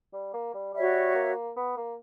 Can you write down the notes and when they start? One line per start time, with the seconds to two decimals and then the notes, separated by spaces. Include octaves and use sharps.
0.13 G3
0.34 A#3
0.54 G3
0.74 G3 F#4 C#5 E5
1.15 A#3
1.56 B3
1.77 A#3